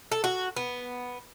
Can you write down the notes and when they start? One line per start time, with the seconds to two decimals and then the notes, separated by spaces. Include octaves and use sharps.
0.12 A4
0.24 F#4
0.57 B3